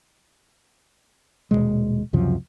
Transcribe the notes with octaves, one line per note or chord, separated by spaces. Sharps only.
D#1 E2 B2 G#3
C#2 F#2 C3 F3